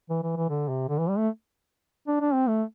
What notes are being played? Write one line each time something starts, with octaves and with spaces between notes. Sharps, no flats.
E3
E3
E3
D3
C3
D3
E3
G3
A3
D4
D4
C4
A3